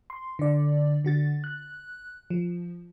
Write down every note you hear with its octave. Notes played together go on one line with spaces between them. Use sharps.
C6
D3 D5
D3 F#4 A6
F#6
F3